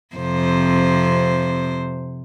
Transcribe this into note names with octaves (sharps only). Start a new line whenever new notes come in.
F2 C3 C5